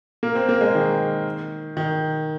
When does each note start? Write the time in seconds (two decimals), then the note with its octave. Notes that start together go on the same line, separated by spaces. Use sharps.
0.23 A#3
0.35 C4
0.49 A#3
0.61 G#3
0.75 D#3
1.77 D#3